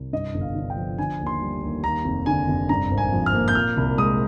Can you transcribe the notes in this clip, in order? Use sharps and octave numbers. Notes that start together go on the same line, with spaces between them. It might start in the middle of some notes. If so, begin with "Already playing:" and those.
Already playing: C2
G2 D#5
G1
F5
D3
G5
F3
D3 G#5
D#2
C6
G3
D#2
D#2 A#5
F1
D3 G#5
F1
G2 A#5
G#1
G#5
F3
F6
A#3
G6
A#2 F6
C2
G#3 D#6